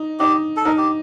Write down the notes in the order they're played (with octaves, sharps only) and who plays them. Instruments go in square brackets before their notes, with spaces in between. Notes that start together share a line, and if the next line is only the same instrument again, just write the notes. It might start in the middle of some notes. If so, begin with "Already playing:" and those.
Already playing: [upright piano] D#4
[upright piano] D#4 [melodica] G4
[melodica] A4
[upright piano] D#4 [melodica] A#4
[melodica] G4